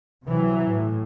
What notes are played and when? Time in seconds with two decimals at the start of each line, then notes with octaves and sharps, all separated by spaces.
0.24 C3 E3 F#3
0.66 A2